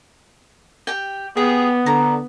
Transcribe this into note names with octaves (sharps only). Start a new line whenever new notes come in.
G4 G5
B3 G4 G#4
D3 A#5